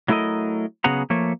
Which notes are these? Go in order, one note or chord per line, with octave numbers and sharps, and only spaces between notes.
F#3 A3 E4 A4 A#4 D#5
C#3 F#3 B3 G#4 F#5 A#5
F3 A3 A#3 C#5